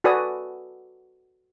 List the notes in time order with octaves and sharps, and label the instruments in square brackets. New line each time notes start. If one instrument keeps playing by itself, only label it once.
[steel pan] F#4 A4 B4 D5 G#5 D#6